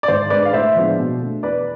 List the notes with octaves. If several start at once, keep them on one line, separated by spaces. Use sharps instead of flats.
D5
G#2 C5
G#3 D4 B4 D5
F5
A2 C5 E5
F3 G#3 B3 D4
B2
A3 D4
E2 B4 D5